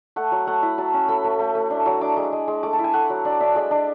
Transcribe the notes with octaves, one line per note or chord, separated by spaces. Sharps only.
A3 F#5
F#3
A3 F#5
E4
F#3 A5
C#4
A3 B5
A3
A3
A3
D4
F#3
D4 D6
G#3 D6
G#3
G#3
A3 D6
A5
E4
G#5
A3 F#5
F#3
D4 D5
D4 E5
G#3 D5
D4 D5